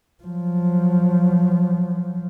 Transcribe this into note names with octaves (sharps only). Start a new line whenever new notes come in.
F3 F#3